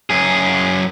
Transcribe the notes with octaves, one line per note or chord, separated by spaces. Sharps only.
F#2 G#4